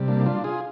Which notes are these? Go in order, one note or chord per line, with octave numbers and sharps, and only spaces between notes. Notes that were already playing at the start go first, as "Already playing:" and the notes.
Already playing: C3 G3
A#3 D4
D4 F4
F4 G#4